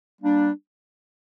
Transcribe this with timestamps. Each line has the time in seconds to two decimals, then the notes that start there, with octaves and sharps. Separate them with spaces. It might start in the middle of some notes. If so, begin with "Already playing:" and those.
0.21 G3 A#3 D4